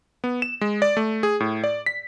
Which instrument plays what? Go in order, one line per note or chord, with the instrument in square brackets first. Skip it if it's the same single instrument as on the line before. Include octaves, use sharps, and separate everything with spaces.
[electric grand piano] B3
E7
G#3
D5
A3
G#4
A2
D5
B6